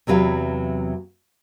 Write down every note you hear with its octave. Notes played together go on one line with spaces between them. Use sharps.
E2 C3 F#3 B4 F5